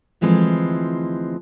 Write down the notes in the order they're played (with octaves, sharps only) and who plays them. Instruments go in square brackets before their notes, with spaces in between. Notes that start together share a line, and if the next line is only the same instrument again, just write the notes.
[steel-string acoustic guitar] D2 E3 F3 G#3 C4